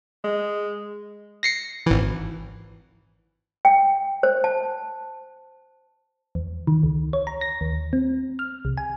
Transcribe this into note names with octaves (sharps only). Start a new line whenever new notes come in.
G#3
A#6 C7 C#7
G#1 E3
G5
C5
A5
E2
D#3
C#2
C#5
A#5
A#6
D#2
C4
F6
C2
G#5